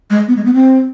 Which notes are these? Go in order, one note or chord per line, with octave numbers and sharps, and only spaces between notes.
G#3
B3
G#3
B3
C4